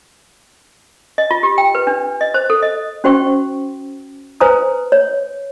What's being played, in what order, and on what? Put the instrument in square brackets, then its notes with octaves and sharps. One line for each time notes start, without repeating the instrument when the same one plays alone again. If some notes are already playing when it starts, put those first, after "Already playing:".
[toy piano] D#5
F4
G4
G5
B4
D4
D#5
C5
A4
D#5
C#4 F#4 C5 G5 C#6
B4 C5 G#5 A#5 D#6
C#5